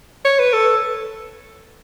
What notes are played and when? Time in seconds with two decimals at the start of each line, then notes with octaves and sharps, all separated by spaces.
0.25 C#5
0.39 B4
0.53 A4